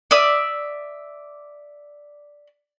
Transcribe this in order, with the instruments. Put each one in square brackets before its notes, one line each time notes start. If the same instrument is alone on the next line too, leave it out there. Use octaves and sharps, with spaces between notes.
[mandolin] D5 E5 D#6